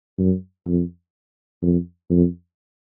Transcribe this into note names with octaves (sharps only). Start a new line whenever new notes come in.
F#2
F2
F2
F2